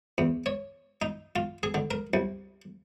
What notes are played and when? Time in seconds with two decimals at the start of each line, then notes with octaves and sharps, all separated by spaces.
0.18 E2
0.46 C#5
1.02 D#4
1.36 F4
1.63 G#4
1.74 D3
1.91 A#4
2.14 C2